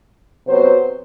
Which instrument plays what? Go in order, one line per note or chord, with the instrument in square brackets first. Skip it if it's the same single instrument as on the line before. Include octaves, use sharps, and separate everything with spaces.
[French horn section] C3 F#3 B3 F#4 C5